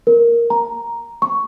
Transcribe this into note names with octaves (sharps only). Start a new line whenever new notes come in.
A#4
A#5
C#6